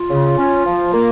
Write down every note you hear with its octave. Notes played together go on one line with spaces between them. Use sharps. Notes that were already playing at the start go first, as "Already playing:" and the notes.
Already playing: F4
C#3
C#4
F3
A#3